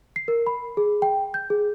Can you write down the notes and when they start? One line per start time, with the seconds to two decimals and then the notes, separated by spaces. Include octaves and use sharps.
0.16 C7
0.28 A#4
0.47 B5
0.77 G#4
1.02 G5
1.34 G6
1.50 G#4